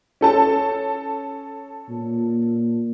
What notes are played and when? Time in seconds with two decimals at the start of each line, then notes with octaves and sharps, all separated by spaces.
0.21 C#4 A4 A5
1.90 A#2